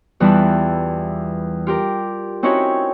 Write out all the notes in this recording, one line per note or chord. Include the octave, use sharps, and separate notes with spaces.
E2 E3 G3 E4 F4 A5
F4 G4 A#4
C4 C#4 D#4 E4 F#4 C#5